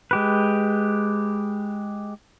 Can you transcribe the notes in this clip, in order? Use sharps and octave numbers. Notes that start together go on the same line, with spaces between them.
G#3 G4 B4